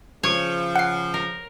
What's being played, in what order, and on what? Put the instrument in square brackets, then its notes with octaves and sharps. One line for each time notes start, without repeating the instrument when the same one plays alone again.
[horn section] C#3 F3 [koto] C#5
[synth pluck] F#5 C7
[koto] A#4